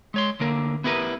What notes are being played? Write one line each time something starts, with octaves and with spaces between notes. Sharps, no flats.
G#3 C#5 C6
D2 D3 A#3 A#4
B3 E4 G4 A#4 B4